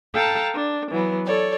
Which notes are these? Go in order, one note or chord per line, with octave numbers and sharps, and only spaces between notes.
A4 F5 G5 A5 A#5
D4
E3 F#3 B3
A4 C#5 D5